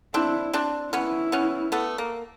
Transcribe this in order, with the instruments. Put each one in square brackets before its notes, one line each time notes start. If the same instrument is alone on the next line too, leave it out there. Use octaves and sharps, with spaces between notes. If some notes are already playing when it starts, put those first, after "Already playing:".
[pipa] C4 D4 [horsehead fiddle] E4
[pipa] C4 D4
[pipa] B3 C#4 [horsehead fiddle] E4
[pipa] B3 C#4
A3 B3
A#3